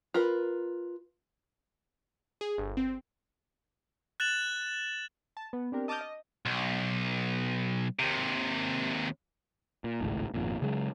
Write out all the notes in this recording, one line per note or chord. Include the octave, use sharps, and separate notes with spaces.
F4 A#4 B4
G#4
G1
C4
F#6 A6 E7 F#7
A5
B3
C4 D4 G4 A#4
D#5 A5 D6 D#6 F6 G6
D#5
B1
D#2 C3
A#2
G#1 C#2 A2
G#1 F2 A#2
C#3 F#3 G#3